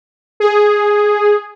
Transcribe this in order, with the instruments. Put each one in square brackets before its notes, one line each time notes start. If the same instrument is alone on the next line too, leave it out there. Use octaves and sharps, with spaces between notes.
[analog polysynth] G#4